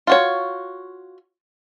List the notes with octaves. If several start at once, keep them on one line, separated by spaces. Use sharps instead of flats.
F4 F#4 C#5